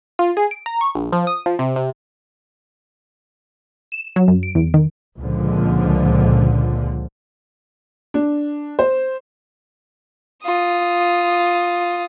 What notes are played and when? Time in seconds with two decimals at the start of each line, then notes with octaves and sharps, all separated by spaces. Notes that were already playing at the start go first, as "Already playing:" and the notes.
0.19 F4
0.37 G#4
0.51 D7
0.66 A#5
0.81 C#6
0.95 A#1
1.12 F3
1.27 D#6
1.46 F3
1.59 C3
1.76 C3
3.92 E7
4.16 F#3
4.28 F#2
4.43 D7
4.55 E2
4.74 D#3
5.19 C#2 A#2 D3 F3
8.14 D4
8.79 C5
10.44 F4 D#6